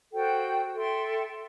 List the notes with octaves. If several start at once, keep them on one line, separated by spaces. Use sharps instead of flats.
F#4 A4 C5 G5
A4 E5 G5 C6